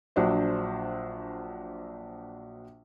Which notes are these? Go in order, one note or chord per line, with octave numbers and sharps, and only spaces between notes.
A#1 F#3 D4 C5